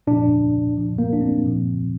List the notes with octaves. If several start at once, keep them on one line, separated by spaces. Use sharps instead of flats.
A#2 F3 D4
A#2 F3
A#3
D4
C4
A#2 F3